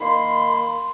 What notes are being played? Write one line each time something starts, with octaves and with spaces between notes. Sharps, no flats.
D#3 A#3 B5 C6